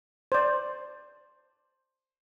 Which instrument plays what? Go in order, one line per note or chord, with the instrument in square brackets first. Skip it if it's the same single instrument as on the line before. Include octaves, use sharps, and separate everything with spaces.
[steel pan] C5 D5